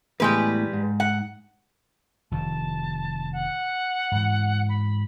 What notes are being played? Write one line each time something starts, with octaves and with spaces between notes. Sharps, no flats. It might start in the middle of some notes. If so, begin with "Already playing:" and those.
E2 A2 G3 G#3 B4
G#2
F#5
F1 D#3 A5
F#5
G#2 E3
B5